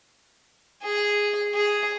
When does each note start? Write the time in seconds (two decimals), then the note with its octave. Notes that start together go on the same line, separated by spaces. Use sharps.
0.83 G#4
1.54 G#4